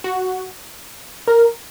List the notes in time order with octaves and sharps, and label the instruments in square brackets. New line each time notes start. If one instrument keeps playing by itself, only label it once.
[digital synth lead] F#4
A#4